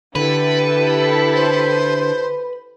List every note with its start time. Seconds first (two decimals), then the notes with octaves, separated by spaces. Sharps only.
0.15 D3 E4 G4 A4 B4
1.35 C5